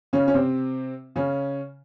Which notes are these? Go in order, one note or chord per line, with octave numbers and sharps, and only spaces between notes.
C#3 C#4
C#4
C3 C4
C#3 C#4